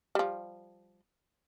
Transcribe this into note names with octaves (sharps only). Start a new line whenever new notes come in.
F3 G3